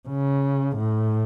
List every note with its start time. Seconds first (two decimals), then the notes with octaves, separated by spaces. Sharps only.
0.09 C#3
0.77 A2